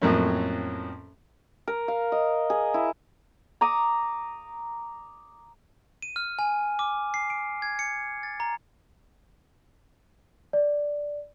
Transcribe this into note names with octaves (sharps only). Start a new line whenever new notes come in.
F2 A2 F#3 A#3 C4 C#4
A#4
F5
D#5
G#4
E4
A#5 D6 D#6
D#7
F6
G#5
D6
C7
D7
G#6
C#7
A6
A#5
D5